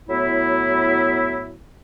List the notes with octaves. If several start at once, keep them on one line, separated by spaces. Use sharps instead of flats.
A2 F#3 B3 E4